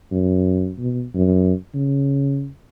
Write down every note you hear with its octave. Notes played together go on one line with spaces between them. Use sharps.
F#2
B2
F#2
C#3